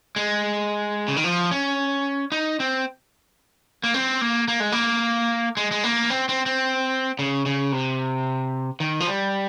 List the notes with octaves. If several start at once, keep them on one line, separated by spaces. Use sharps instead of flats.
G#3
C#3
D#3
F3
C#4
D#4
C4
A#3
C4
A#3
A#3
G#3
A#3
G#3
G#3
A#3
C4
C4
C4
C#3
C#3
C3
D#3
F3
G3